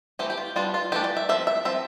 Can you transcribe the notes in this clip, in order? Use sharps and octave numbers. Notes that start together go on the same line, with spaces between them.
E3 A3 C4 G4
G4
F4
G3 B3 D4 F4
F4
E3 A3 D4 G4
D5
E5
F3 C4 E5
E5
F3 C4 E5